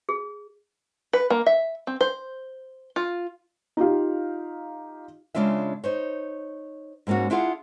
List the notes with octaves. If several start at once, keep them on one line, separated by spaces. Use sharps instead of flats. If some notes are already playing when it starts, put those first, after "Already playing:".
G#4
B4
A#3
E5
C4
C5
F4
D#4 F4 G4 F5
C#3 F#3 G#3 D4 F4 E5
D#4 C5 C#5
G#2 G#3 A#3 C#4 F#4
D4 E4 F4 G#4 F#5